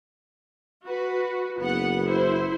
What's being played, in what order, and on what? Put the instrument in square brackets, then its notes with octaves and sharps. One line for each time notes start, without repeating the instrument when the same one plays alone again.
[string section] F#4 B4
[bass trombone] F#1 [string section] B3 F#5
[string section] E4 C5